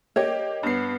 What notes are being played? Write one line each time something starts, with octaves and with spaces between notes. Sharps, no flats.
A#3 G4 C#5 D#5
G2 B3 C7